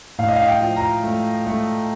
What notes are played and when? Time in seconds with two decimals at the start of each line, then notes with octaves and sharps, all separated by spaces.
0.18 A2 F5
0.28 D#5
0.36 F5
0.48 G5
0.61 F3
0.76 A#5
1.03 A3
1.46 A3